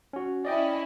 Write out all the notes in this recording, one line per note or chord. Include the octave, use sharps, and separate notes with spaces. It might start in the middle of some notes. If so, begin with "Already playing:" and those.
C#4 F#4
C#4 E4 D5 D#5 G5